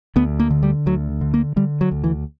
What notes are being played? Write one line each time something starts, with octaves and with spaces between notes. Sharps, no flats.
D2 B3
A#3
D3
G3
D2 F#3
D3
A#3
D3 G3
F#3
D2
E3